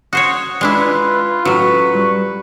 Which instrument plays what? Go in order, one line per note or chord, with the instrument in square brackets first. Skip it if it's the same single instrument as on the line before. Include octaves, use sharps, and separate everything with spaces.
[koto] F#4 C5 C#5 [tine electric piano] D#6
[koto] G#3 D4 E4 [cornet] F4 [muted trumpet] B4
[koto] A2 F#3 [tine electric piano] C#4 F4 F#4 [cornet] B4 [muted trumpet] C#6
[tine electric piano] G3